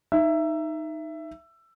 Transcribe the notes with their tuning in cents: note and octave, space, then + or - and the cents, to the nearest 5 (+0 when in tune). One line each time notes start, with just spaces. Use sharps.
D#4 +0 E5 +15